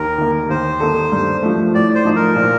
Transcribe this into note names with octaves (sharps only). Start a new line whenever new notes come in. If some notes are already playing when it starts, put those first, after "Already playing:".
Already playing: D#2 A#4
D#3 A#3
D#2 C5
D#3 A#3 D#4 A4
G2
F3 A3
A2 D5
C5
F3 A3 D#4
A#4
A#2